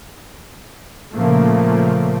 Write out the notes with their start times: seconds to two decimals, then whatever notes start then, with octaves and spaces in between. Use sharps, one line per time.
1.14 A#2 C#3 F3 A3 A#3